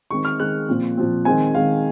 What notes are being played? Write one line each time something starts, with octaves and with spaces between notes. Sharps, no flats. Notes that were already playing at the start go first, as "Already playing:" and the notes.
D#3 G#3 C4 C#6
F6
D#3 G#3 C4 F#6
A#2 F3 C4
A#2 F3 C4
D#3 G#3 C4 G#5
D#3 G#3 C4 F5